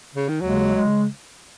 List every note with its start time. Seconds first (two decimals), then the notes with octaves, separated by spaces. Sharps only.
0.15 C#3
0.29 D#3
0.41 D#2 C#3 F#3 G#3
0.74 C#3 G#3